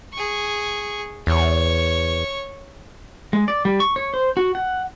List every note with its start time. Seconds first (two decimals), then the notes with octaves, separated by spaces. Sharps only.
0.13 G#4 C#6
1.27 E2 C#5 C#6
3.33 G#3
3.48 D5
3.65 G3
3.80 C#6
3.96 C#5
4.14 C5
4.37 F#4
4.55 F#5